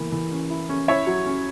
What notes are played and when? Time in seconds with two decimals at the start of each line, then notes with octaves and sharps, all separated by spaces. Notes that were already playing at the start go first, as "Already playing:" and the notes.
Already playing: E3 A#3 B3
0.12 E3
0.31 C#4
0.50 E4
0.69 C#4
0.88 E4 C#5 E5
1.07 F#3
1.26 C#4